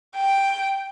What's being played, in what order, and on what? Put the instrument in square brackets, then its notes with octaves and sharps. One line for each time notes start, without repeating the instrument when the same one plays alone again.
[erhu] G5